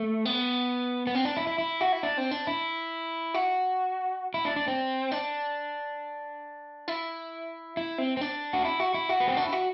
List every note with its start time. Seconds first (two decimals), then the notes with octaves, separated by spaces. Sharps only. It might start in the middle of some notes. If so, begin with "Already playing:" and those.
Already playing: A3
0.25 B3
1.07 B3
1.15 C4
1.25 D4
1.37 E4
1.47 E4
1.58 E4
1.81 F#4
1.92 E4
2.03 D4
2.18 C4
2.31 D4
2.47 E4
3.34 F#4
4.34 E4
4.45 D4
4.56 D4
4.68 C4
5.12 D4
6.88 E4
7.77 E4
7.98 C4
8.17 C4
8.21 D4
8.53 F#4
8.65 E4
8.80 F#4
8.94 E4
9.09 F#4
9.20 B3
9.28 C4
9.37 D4
9.44 E4
9.53 F#4